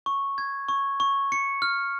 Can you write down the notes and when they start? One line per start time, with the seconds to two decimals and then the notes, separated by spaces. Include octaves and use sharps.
0.06 C#6
0.38 G#6
0.68 C#6
1.00 C#6
1.32 C#7
1.62 F6